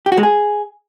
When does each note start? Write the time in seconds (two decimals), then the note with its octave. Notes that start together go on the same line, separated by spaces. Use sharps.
0.06 G4
0.12 F#4
0.17 G#3
0.23 G#4